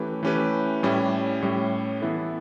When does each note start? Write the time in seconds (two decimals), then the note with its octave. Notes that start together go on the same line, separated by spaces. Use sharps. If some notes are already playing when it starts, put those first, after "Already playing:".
Already playing: E3 A3 C#4 G4 B4
0.23 E3 A3 C#4 G4 B4
0.83 A2 G3 C#4 E4
1.42 A2 G3 C#4 E4
2.01 E3 B3 E4 A4